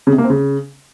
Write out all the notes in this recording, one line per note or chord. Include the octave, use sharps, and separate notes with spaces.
C#3
C3
A#3
C4
C#3